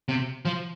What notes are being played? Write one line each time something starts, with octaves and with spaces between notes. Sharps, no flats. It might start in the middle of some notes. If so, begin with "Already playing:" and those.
C3
F3